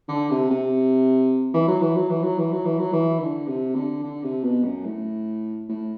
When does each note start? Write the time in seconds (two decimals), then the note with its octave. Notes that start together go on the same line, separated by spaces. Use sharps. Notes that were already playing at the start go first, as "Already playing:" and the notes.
0.08 D3
0.30 C3
0.50 C3
1.54 E3
1.68 F#3
1.81 E3
1.96 F#3
2.09 E3
2.23 F#3
2.38 E3
2.52 F#3
2.65 E3
2.79 F#3
2.93 E3
3.19 D3
3.47 C3
3.75 D3
4.03 D3
4.23 C3
4.44 B2
4.64 F#2
4.85 A2
5.69 A2